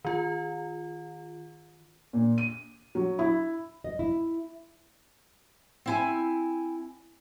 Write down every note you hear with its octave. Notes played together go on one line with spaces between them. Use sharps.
D#3 F4
A#2
D#7
F#3
E4
D#5
E4
C4 E4 G#5